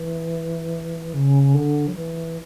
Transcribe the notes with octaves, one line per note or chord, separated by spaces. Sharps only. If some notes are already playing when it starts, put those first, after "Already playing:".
Already playing: E3
C#3
D3
F#3
E3